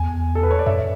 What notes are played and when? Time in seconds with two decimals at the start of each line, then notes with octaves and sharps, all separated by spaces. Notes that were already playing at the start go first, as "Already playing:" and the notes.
Already playing: E2 G#5
0.35 A4
0.43 B4
0.51 C#5
0.59 D5
0.66 F#2 E5